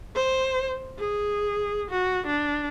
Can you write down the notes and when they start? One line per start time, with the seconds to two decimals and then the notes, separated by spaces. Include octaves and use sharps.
0.15 C5
0.98 G#4
1.91 F#4
2.27 D4